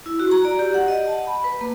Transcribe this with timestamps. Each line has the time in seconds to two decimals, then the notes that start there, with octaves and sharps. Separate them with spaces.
0.06 E4
0.20 F#4
0.31 A#5
0.45 D5
0.59 G4
0.74 F#5
0.88 D#5
1.08 A5
1.27 B5
1.44 B4
1.61 A#3